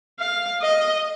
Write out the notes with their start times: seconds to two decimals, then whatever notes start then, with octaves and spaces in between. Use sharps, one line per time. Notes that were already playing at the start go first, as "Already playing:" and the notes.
0.20 F5
0.62 D#5